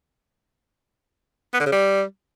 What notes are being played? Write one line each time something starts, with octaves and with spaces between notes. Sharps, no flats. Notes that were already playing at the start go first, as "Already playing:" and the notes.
B3
D3
C#3
G3